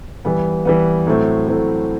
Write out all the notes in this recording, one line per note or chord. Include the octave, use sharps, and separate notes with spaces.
E3 G3 B3
E3 G3 B3
A2 F#3 A3 C4
A2 F#3 A3 C4